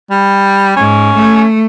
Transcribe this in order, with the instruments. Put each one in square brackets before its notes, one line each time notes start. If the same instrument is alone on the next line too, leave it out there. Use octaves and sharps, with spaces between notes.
[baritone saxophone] G3
[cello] G#2 [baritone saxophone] C#4
[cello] A3